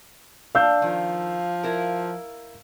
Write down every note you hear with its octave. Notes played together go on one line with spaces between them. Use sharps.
D4 F5 E6 G6
D#3 F3
E4 A#4